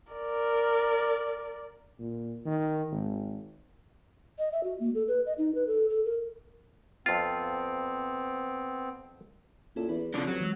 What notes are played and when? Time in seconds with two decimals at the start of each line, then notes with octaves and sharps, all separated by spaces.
0.12 A#4 D5
2.00 A#2
2.45 D#3
2.92 G#1
4.39 D#5
4.52 E5
4.64 F#4
4.80 A#3
4.95 A4
5.08 B4
5.26 D#5
5.38 D#4
5.55 B4
5.67 A4
5.89 A4
6.05 A#4
7.06 F2 B3 C4 F4
9.76 A#2 C#4 E4 A4
9.89 E2 E4 B4 D5
10.14 F2 C#3 D4 A5
10.27 F#3 G4 B4
10.41 E3 G#3 E6